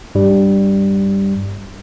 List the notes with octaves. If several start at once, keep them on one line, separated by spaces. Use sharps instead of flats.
G2 G3